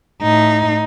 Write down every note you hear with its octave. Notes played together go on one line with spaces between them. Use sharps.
A2 D#4